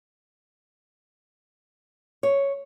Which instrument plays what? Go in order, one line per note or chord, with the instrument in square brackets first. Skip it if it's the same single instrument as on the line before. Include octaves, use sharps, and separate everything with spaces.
[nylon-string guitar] C#5